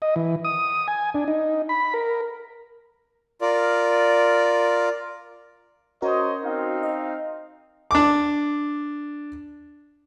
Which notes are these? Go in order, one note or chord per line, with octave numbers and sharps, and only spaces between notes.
D#5
E3
D#6
G#5
D4
D#4
B5
A#4
F4 A#4 D5
C#4 F#4 A#4 C5 C#5 D#5
C4 D#4 F5
D#5
D4 D6